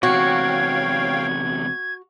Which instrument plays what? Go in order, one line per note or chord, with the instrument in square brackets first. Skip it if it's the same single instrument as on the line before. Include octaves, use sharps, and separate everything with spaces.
[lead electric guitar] E2 C3 [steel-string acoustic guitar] F#4 [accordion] C#5 F5 G5 [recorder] G#6